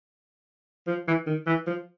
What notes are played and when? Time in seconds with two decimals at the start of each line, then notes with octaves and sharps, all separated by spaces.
0.88 F3
1.08 E3
1.27 D#3
1.47 E3
1.67 F3